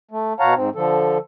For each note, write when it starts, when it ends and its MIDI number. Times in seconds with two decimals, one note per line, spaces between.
0.11 0.33 57
0.40 0.54 47
0.40 0.54 73
0.40 0.54 77
0.40 0.54 78
0.40 0.54 81
0.40 0.54 82
0.55 0.70 44
0.55 0.70 60
0.75 1.18 50
0.75 1.18 53
0.75 1.18 69